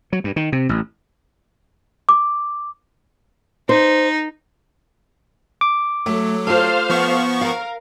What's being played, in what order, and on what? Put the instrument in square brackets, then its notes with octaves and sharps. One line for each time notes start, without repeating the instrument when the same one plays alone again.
[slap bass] F#3
G2
D#3
C3
A1
[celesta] D6
[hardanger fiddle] D#4 [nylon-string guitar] C5
[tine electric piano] D6
[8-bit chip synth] F#3 [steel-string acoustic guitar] A3
[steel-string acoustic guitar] F4 A4 [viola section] C5 F5
[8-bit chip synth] F3 B3 C#6
[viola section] A#4 [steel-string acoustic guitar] F5